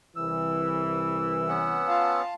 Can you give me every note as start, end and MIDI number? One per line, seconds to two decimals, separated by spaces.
0.16 1.85 36
0.16 1.85 52
0.16 2.20 88
1.49 2.23 59
1.49 2.23 61
1.49 2.23 78
1.88 2.34 65
1.88 2.34 77
1.88 2.34 81